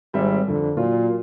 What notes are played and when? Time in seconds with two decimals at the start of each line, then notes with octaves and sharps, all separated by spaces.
0.14 G#1 G3 C4 E5
0.48 F2 D3
0.77 A#2 F#3 F4